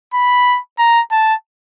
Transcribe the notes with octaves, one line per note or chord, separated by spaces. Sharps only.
B5
A#5
A5